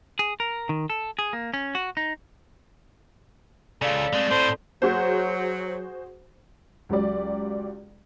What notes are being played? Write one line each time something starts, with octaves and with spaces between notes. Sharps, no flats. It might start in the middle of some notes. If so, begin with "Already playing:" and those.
G#4
A#4
D#3
A4
G#4
A#3
C#4
F#4
D#4
C#2 C#3 A4 D5 F5
G#3 A3 C4 D5
A2 A4 C5
F#3 F#4 G#4 C5
C#2 F#3 G4 D5